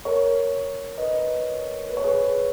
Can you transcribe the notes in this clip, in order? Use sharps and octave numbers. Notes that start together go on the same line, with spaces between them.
A#4 C#5
B4 D#5
B4
C#5
G#4 B4